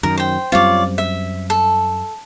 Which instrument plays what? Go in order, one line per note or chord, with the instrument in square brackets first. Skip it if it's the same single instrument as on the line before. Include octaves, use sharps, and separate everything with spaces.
[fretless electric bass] F#2 D#3 [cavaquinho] A#4
[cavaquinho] C5 G5
[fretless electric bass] F#2 G3 C4 [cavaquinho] F4 C#5 D5
[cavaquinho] E5
A4